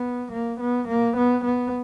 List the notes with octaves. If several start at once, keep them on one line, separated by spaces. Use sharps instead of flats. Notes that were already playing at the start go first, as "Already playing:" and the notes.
Already playing: B3
A#3
B3
A#3
B3
B3